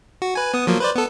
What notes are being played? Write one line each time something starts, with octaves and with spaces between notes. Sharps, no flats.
F#4
B4 G#5
B3 D#6
F3 F#3 A#3
B4 C5 D5
B3 A4